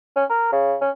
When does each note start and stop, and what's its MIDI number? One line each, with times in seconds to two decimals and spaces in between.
0.16 0.24 61
0.30 0.49 70
0.52 0.76 49
0.82 0.90 61